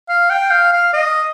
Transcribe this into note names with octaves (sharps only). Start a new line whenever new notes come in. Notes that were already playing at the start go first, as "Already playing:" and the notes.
F5
G5
F5
F5
D#5